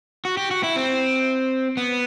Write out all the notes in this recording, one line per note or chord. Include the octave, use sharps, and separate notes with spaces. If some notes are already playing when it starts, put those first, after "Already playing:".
F#4
G4
F#4
E4
C4
B3